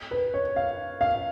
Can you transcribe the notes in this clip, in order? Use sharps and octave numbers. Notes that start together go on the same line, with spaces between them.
B4
C#5
F5
F5